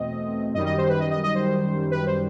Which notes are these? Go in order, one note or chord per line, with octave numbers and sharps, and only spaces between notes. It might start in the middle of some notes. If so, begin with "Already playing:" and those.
Already playing: E2 B2 A3 C4 D#5
F#2 D#3 G3 D#5
D#5
C5
B4
D#5
D#5
D#5
C5
B4
C5